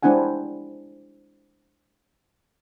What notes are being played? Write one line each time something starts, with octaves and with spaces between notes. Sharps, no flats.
G#3 C4 D4 E4 F#5 G#5